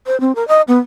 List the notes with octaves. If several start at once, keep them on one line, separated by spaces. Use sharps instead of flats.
C5
C4
A#4
D#5
B3